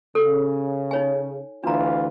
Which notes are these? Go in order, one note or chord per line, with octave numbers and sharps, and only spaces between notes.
C#3 A4
D#4 C#5 G#5
D2 E3 D4 F4 A#5